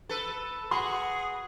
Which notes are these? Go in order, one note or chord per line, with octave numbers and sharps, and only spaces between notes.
A4 B4
F#4 G#4 C6